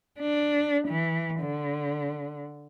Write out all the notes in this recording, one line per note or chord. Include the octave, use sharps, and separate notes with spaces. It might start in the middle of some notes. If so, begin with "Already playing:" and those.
D4
E3
D3